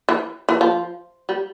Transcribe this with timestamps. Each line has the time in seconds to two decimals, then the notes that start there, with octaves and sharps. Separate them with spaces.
0.09 E3
0.49 E3
0.61 F3
1.29 G3